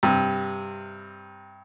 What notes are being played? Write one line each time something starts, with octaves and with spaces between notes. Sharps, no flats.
G2 C3